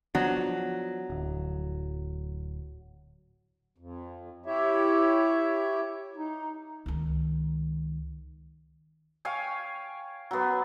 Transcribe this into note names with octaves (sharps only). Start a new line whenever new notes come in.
F3 F#3 B3 D4
D1
F2
E4 G4 C#5 E5
D#4
C#2 D#3
C#5 F5 G5 G#5
F#3 B3